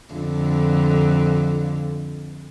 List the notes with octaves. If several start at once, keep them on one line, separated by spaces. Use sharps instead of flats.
F2 D3